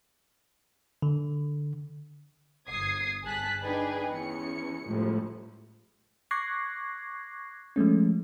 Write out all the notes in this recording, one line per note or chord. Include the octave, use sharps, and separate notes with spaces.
D3
G1 D#6 G#6 C7
G1 G#4 A5 F#6 B6
D4 D#4 G#4 B4 G5 G#5
E2 C#4 C#7
G1 C#2 A2 F3
C#6 D6 F#6 G#6 A#6 C7
F3 G#3 A3 C#4